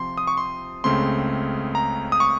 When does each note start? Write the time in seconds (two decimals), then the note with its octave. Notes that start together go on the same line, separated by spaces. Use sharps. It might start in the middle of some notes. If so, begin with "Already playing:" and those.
Already playing: C3 F3 C4 C6
0.18 D#6
0.27 C#6
0.37 C6
0.84 C#2 C#3 A3 C4 C6
1.75 A#5
2.12 D#6
2.20 C#6